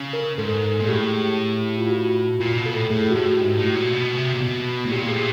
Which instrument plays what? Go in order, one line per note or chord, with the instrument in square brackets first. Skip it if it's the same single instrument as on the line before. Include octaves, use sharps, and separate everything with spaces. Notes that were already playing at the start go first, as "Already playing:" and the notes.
Already playing: [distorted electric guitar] C#3
[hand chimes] A#4
[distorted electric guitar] G#2 [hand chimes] A4
[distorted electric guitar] A#2
[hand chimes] G#4
[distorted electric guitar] A2 [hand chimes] G4
[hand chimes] F4
F#4
[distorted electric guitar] A#2 [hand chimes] F4
[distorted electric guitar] B2
[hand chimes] A4
[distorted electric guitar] A2
[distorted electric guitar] A2 [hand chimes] G#4
[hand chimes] F#4
[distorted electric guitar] A2 [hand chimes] G4
[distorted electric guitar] G#2
A2
[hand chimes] F#4
[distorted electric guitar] A#2
B2
C3
A#2
B2
A2
[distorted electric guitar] A#2 [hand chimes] G4
[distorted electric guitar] A2 [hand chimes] G#4
[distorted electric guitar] A#2